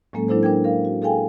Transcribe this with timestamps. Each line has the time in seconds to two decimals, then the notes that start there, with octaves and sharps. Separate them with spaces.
0.13 A2 F#3 G#3 A#3 C#4 A4
0.28 F#3 D4 E4 A4 C5
0.43 D4 A#4 G5 G#6
0.64 A#4 F5
0.85 F#4
1.02 G#4 A4 F5 G5 G#5